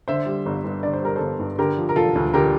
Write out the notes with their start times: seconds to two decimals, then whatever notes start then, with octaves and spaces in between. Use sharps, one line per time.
0.08 D3 C5 E5
0.26 G3
0.46 G1
0.64 G2
0.83 D3 D5
0.93 C5
1.02 G3 A#4
1.16 G1 A4 C5
1.39 G2
1.59 D3 G4 A#4
1.78 F3
1.89 A#4
1.96 E1 F4 A4
2.15 D2
2.33 D3 G4 A#4